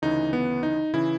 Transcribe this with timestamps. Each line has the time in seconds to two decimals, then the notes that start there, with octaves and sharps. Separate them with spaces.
0.02 D2 C#3 E3 D#4
0.33 B3
0.63 D#4
0.94 C#3 E3 E4